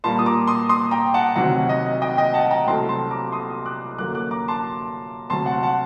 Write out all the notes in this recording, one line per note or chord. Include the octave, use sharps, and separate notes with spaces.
A#2 G3 A#3 A5 C6
D#6
A#5 D6
C6 D#6
C6 D#6
G5 A#5
F#5 A5
D2 C3 D#3 F#3 F#5
D#5
D#5 G5
D#5 G5
F#5 A5
G5 A#5
C2 C3 F#3 A3 A5 C6
A5 C6
A#5 D6
C6 D#6
D6 F#6
F#2 D3 F#3 A#3 D6 F#6
D6 F#6
A#5 D6
A5 C6
D2 C3 F#3 A5 C6
F#5 A5
F#5 A5